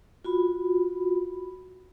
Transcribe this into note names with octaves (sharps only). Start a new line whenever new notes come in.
F4 F#4 B5